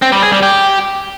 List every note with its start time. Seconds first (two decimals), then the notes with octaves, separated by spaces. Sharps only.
0.02 C4
0.12 G3
0.22 G#4
0.33 G3
0.43 G4